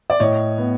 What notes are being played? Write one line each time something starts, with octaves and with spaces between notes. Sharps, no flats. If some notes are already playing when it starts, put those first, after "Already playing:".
D5
A2 C#5 D#5
B3